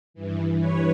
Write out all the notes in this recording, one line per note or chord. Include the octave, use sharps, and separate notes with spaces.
G2 E3
B4 C#5